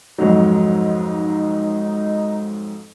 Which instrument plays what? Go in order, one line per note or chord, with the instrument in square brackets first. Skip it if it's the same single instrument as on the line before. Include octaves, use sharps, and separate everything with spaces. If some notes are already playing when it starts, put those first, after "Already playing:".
[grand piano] F2 G#2 F#3 [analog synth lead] D#4